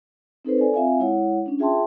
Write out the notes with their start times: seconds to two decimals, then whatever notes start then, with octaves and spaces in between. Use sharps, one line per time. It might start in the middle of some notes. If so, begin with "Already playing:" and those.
0.45 C4 D#4 A4 B4 C5
0.58 A4 D5 G#5
0.74 C4 F4 E5 F5 G#5
0.99 G#3 E4 C#5 F#5
1.46 C#4 D4
1.59 F4 G#4 E5 G5 A5 C6